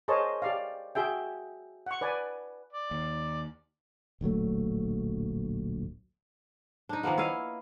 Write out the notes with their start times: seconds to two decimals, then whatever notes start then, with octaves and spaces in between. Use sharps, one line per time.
0.08 G#4 A#4 C5 C#5 D#5 A5
0.42 G4 D5 F5
0.95 F#4 G#4 E5 G5
1.86 F#5 C#6
2.01 B4 D5 G#5
2.73 D5
2.91 D#2
4.21 D1 A#1 F#3 A3
6.89 D4 D#4
7.03 D#3 F3 A#3 B3
7.18 E4 C#5 D#5 F5